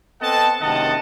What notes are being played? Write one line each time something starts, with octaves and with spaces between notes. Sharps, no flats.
B3 C4 A4 D#5 F#5 A5
F#1 C3 D#3 D#5 F#5 A5